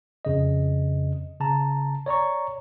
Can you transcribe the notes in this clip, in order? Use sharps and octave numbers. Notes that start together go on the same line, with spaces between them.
F2 C#3 D#5
C#3 A5 A#5
C#5 D5 A#5 C#6